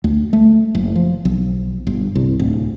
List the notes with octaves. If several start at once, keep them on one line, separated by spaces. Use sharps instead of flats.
D2
A3
F#1
F3
B1
G1
C2
D1